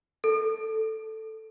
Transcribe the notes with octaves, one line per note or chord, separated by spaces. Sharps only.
A4